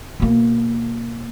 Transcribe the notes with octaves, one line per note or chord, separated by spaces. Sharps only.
B2 A#3